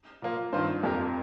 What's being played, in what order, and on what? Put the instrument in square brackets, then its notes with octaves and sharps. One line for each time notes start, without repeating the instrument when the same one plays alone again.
[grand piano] A#2 F3 A#3 F4
[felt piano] G2 [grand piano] D#3 C4 F4 C5
[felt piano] F2 [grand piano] A#3 G4 A#4